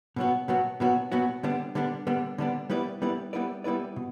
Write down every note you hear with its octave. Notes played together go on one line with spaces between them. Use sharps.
B2 F#3 B3 F#4
B2 F#3 B3 F#4
B2 F#3 B3 F#4
B2 F#3 B3 F#4
D3 G3 B3 D4
D3 G3 B3 D4
D3 G3 B3 D4
D3 G3 B3 D4
G3 B3 E4 B4 D5
G3 B3 E4 B4 D5
G3 B3 E4 B4 D5
G3 B3 E4 B4 D5
B2